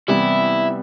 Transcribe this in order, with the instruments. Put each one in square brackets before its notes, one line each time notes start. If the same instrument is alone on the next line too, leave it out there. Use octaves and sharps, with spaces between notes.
[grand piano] C3 E3 G3 B3 [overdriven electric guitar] E4